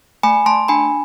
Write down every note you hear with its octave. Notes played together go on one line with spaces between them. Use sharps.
A3 G#5 B5
A3 A5 C6
D4 G#5 B5